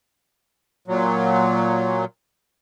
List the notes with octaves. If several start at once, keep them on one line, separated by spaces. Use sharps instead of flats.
A#2 F#3